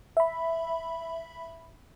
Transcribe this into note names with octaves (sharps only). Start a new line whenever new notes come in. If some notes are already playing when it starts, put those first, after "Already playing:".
E5 B5